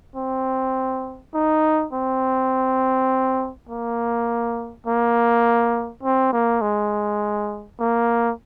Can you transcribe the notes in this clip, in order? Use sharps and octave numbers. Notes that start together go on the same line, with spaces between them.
C4
D#4
C4
A#3
A#3
C4
A#3
G#3
A#3